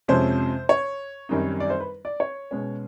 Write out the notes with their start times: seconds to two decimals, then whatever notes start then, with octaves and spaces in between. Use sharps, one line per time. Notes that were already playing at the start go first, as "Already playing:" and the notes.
0.08 F2 C3 F3 G#3 C#4 C5
0.69 C#5
1.29 F#2 D#3 G3 C4 D#4
1.60 D5
1.70 C5
1.80 B4
2.05 D5
2.20 C#5
2.51 B2 G#3 C#4